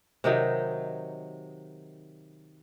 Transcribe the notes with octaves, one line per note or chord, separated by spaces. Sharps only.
C3 D#3 F#3 D#4